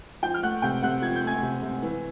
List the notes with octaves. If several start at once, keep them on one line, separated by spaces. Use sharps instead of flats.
F3 G5 G6
F6
A3 F#5 F#6
C3 G5 G6
C3 F#5 F#6
F3 G#6
G6
A3 G#5 G#6
C3
C3
E3